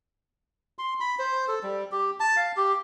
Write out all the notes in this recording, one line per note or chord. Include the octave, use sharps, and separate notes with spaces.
C6
B5
C5
A4
G3
G4
A5
F5
G4